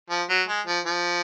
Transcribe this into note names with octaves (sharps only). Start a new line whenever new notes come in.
F3
F#3
G#3
F3
F3